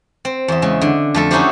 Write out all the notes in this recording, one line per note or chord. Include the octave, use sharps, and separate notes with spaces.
C4
E2 E5
C#3 G#3
D3
F2 A3 A4
C#4 D#4 E4 F#4 G4 C5